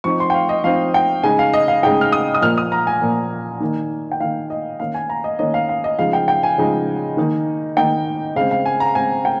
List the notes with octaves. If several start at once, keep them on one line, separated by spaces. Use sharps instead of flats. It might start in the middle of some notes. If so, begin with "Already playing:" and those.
F3 C4 D#4 C#6
C6
G5
F5
D#5
F3 C4 D#4 F5
G5
C#3 G#3 D#4 G#5
F5
D#5
F5
C#3 G#3 D#4 G5
F6
D#6
D#6
A#2 F3 A#3 F6
D#6
A#5
G#5
A#2 F3 A#3
D#3 A#3 D#4
G5
D#3 A#3 D#4 F5
D#5
D#3 A#3 C#4 F5
G#5
A#5
D#5
D#3 A#3 C#4 D#5
F5
F5
D#5
C#3 F3 G#3 D#4 F5
G5
G5
G#5
C#3 F3 G#3 D#4
D#3 A#3 D#4
D#3 A#3 D#4 G5
C#3 G#3 C4 F5
F5
G#5
A#5
C#3 G#3 C4 G#5
G5